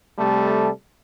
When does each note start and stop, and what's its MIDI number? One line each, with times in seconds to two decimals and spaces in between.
0.19 0.70 48
0.19 0.70 55
0.19 0.70 57
0.19 0.70 69